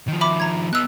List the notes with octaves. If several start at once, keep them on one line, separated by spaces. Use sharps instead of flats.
D#3 F3
E5 B5 D6
A#5 G#6
B3 D#4 E6 F#6